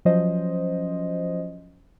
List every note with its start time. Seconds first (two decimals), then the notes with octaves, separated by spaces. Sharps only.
0.05 F3 F#3 C#4 C5 D#5